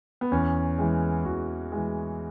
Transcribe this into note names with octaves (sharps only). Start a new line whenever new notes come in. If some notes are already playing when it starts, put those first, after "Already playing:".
B3
E2 C#4
E3 G#3
E2 F#4
E3 G#3